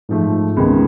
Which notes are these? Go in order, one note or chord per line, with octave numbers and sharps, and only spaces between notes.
G#2 F3 A3
C#2 C3 D#3 G#3 B3